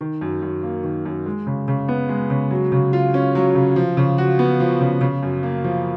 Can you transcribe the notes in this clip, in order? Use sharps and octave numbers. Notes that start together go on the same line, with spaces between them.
D#3
F#2
F#2
A#3
D#3
F#2
G#3
C#3
C#3
B3
G#3
C#3
F#3
C#3
F4
C#4
F#3
C#3
F3
C#3
F#4
B3
F3
C#3
C#3
F#2
A#3
F3